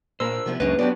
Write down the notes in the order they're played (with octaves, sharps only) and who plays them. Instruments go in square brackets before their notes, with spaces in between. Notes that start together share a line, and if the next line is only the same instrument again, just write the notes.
[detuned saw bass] A#2 [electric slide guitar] D4 A#4 C5 [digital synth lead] E6
[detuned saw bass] C3 [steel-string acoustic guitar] F3 B3 E4
[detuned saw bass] C#2 [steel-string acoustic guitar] F#2 G#3 C#4 [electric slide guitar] A#3 D4 [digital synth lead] B4
[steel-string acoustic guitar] C#3 G4 D5 [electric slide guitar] F#3 D4 [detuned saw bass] B3